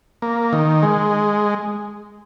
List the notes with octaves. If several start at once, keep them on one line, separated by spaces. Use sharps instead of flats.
A#3
D#3
G#3